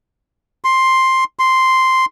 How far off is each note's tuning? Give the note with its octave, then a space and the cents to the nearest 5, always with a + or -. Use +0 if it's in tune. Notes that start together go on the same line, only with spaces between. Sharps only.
C6 +5
C6 -5